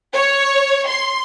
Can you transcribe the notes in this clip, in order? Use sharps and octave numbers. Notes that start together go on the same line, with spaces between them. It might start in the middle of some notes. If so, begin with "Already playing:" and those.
C#5
C6